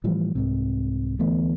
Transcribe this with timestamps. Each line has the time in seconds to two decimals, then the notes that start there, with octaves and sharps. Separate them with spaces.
0.04 A2 E3 F3 G3
0.35 C2 G#2 C3
1.19 D2 E3 A3 B3